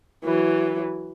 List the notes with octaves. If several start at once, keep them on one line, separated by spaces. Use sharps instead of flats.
E3 F#3